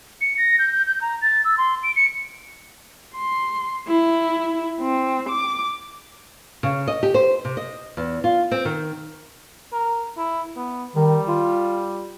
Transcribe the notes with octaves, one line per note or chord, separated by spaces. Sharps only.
C#7
A#6
G6
G6
G6
A#5
A6
E6
C6
D7
C#7
C6
E4
C4
D6
C#3
D#5
G4
C5
C3
D#5
E2
F4
C4
D#3
A#4
E4
B3
D#3 G3
F4